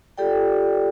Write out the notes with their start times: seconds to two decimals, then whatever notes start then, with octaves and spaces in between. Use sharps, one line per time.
0.18 F4 G4 A4 D5 G5